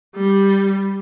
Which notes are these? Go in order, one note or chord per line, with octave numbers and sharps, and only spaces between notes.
G3